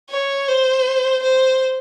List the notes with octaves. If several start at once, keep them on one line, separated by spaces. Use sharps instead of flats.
C#5
C5
C5